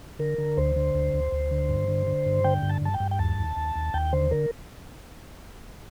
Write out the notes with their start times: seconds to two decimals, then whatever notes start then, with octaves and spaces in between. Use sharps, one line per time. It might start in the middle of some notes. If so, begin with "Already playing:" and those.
0.19 D3 A#4
0.38 D3
0.57 D2 C5
0.76 D3
0.95 D2
1.14 D2
1.32 D2
1.51 D3
1.69 G2
1.88 D3
2.07 D3
2.26 G2
2.44 D3 G5
2.63 G2
2.69 A5
2.82 G2 A5
2.94 G5
3.00 G2
3.11 G5
3.19 D#2 A5
3.38 D#2
3.56 D#2
3.76 D#2
3.94 D#2 G5
4.13 D3 C5
4.31 D3 A#4